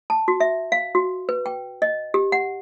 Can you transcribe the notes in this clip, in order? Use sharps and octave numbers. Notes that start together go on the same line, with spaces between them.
A5
F#4
E5
F5
F#4
B4
G5
D#5
G4
F#5